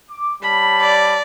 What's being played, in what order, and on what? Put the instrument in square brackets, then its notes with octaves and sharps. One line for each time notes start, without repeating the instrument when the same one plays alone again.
[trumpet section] D6
[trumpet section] G3 C#5 A5 [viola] B5
[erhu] D5